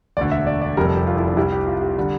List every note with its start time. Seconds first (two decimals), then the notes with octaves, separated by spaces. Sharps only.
0.17 E1 D2 D3 D5
0.31 E5
0.47 D5
0.62 D5
0.77 F1 F2 C3 G3 A#4
0.87 A4
0.97 G4
1.07 F4
1.17 E4
1.27 D4
1.37 C2 C3 G3 E4
1.52 G4
1.67 F4
1.82 G4
1.98 D3 G3